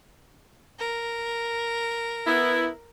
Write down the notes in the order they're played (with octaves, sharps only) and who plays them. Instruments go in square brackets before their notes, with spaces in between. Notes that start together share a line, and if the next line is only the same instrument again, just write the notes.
[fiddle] A#4
[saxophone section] B3 E4